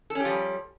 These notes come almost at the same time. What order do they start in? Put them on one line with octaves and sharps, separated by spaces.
A4 C#4 G4 F3 G3